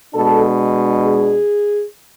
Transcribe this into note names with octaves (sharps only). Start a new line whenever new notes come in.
B2 G#3 D4 A4
G#4